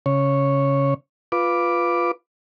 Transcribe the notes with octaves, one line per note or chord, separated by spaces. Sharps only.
C#3 C#5
F4 B4 D6